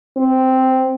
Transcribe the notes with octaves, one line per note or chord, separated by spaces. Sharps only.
C4